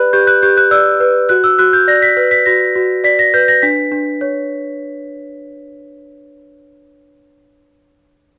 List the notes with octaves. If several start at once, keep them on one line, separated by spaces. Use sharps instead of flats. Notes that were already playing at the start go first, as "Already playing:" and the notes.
Already playing: G4 B4 D5 B5 F#6
G4 G6
F#6
G4 G6
F#6
D5 E6
B4
F#4 F#6
E6
F#4 F#6
G6
D5 A#6
B6
B4
B6
F#4 A#6
F#4
D5 B6
A#6
B4 G6
A#6
D4 B6
D4
C#5